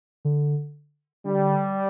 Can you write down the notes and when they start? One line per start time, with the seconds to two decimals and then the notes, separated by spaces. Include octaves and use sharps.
0.25 D3
1.25 D3 G3